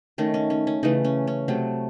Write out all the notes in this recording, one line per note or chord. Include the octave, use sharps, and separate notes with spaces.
D#3 A3 C#4
C#4
C#4
C#4
C#3 E3 A3 D#4
C#4
C#4
C3 F#3 A3